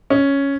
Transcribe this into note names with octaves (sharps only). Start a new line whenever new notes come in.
C#4